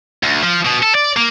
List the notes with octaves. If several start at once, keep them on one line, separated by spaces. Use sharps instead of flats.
D2
F3
B2
A4
D5
A#3